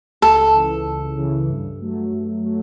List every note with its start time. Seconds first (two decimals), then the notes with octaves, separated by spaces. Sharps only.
0.22 C#2 A4
0.54 C#3 E3
0.85 C#2
1.18 C#3 E3
1.49 G2
1.81 F#3 A3
2.13 G2
2.44 F#3 A3